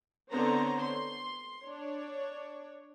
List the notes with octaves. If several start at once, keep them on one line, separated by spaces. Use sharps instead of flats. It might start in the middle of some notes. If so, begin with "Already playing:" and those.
D3 B3 C4 C5 C#5 A#5
C6
D4 C#5